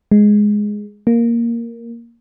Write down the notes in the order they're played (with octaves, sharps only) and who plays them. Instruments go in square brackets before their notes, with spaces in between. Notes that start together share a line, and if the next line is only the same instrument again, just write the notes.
[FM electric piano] G#3
A#3